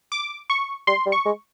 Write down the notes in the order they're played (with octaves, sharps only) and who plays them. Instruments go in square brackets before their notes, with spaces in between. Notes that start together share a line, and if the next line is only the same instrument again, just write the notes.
[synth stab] D6
C#6
[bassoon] G3 [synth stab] C6
[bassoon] G3
[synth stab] C#6
[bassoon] G#3